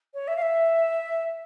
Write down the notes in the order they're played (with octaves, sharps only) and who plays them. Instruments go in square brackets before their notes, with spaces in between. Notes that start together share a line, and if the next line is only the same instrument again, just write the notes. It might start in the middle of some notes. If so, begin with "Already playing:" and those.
[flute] C#5
E5
F5
E5